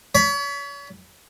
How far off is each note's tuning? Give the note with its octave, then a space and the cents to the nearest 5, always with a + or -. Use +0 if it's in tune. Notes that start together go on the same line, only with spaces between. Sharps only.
C#5 +35 B5 +0